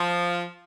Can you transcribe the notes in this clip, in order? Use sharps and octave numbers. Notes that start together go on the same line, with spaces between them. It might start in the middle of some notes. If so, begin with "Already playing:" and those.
Already playing: F3